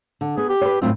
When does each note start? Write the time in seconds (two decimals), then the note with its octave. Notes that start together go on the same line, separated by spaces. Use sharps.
0.21 D3
0.37 B3 G#4
0.50 G4
0.61 B4 C#5
0.82 F#2 A2 C4 F4